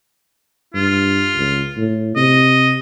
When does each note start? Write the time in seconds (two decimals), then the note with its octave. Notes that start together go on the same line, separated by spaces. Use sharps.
0.74 G2 F4
1.36 C#2
1.77 A2
2.16 C3 D#5